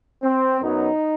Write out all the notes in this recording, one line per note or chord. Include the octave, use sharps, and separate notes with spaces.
C4
F#2 F#3 B3 D#4